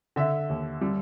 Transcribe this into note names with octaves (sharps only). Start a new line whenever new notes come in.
D3 E5
D#2
G3